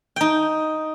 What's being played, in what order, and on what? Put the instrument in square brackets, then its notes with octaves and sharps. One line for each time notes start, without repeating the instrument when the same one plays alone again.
[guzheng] D#4 G5